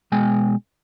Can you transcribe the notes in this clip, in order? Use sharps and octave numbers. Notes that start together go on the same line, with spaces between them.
B2 G#3 G5 G#5